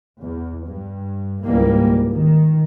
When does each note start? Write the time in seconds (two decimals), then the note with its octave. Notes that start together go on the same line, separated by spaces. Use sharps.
0.20 E2
0.67 G2
1.43 C#2 G#2 E3 G3 A#3
2.13 D#3